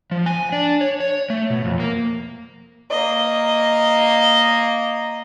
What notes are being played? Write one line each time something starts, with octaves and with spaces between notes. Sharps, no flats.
F3
G#5
D4
C#5
C#5
A3
B2
F2
A#3
A#3 D#5